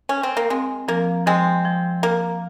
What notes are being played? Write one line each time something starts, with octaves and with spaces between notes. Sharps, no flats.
C#4
C4
A#3
G#3 C4
F3 A#3
F3 G#3 C4
F3
F3 A#3